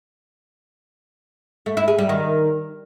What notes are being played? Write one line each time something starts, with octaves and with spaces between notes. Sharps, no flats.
A3
E4
G#4
G3
D#3